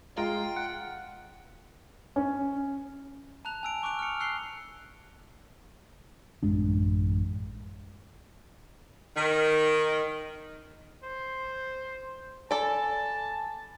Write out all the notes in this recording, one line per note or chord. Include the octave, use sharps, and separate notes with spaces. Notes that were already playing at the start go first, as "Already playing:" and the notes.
G#3 F4 F5 G5 A#5
F#5
C#4
A5 A#5 F#6 F7
G#5 E6 D7
C#6 D6 E6 F#6 D7 F7
F6 C#7
E6 F#6 C7 G7
A1 F#2 G#3 D4
D#3
C5
A4 D5 G#5 A5 B5